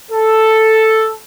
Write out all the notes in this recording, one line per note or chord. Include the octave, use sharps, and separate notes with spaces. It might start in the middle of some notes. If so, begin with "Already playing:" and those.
A4